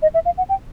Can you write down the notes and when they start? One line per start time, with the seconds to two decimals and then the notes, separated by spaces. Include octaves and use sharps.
0.02 D#5
0.14 E5
0.25 F5
0.38 F#5
0.49 G5